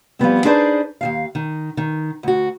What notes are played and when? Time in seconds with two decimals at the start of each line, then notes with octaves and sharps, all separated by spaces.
0.19 F3 G3 B3 C4
0.45 D4 D#4 G#4 B4 C5 D5
1.01 D#2 C3 F5
1.35 D#3
1.77 D#3
2.23 D2 F#4